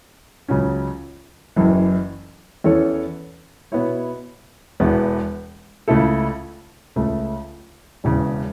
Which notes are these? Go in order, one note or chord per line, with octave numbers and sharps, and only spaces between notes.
C#2 C#3 F#3 C#4
F#1 F#2 E3
E2 E3 C#4 A4 C#5
B2 B3 E4 C#5
E1 E2 E3 B3
C#2 C#3 A3 E4 A4
C#2 C#3 A3
E1 E2 C#3